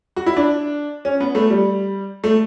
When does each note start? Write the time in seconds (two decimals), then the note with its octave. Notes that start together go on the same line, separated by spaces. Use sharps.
0.16 F#4
0.26 E4
0.37 D4
1.05 C#4
1.20 B3
1.35 A3
1.50 G3
2.24 A3